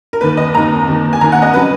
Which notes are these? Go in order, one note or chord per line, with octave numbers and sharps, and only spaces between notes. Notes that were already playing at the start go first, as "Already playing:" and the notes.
A#4
D#2 D#3 A#3 B4
D#5
D#2 D#3 A#3 A#5
D#2 D#3 A#3
G#5
D#2 D#3 A#3 A#5
F#5
D#5
C#3 F#3 B4